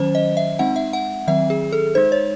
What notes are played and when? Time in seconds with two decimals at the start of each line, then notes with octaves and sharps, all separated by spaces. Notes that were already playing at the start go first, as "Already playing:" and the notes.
Already playing: D#3 F#3 C#4 C5
0.15 D#5
0.37 E5
0.59 G#3 C4 D#4 F#5
0.76 E5
0.93 F#5
1.27 D#3 F#3 C4 E5
1.50 G#4
1.73 A4
1.95 G#3 D#4 C5
2.12 C#5